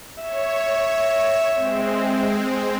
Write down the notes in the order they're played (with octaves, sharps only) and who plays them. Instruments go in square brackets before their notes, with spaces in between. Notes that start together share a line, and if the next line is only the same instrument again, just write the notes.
[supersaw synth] C#5 [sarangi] E5
[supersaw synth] G#3 C4